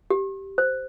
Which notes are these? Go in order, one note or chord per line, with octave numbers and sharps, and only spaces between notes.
G4
C5